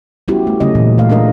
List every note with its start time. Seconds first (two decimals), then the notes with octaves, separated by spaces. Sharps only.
0.28 G3 B3 C#4 E4 F#4 G4
0.47 A3
0.60 C#3 F#3 A3 C#4 D#5
0.75 A#2 E3
0.98 A3 F5
1.10 G#3 D4 A#4 D#5